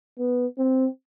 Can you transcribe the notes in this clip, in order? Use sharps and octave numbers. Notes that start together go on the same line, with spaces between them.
B3
C4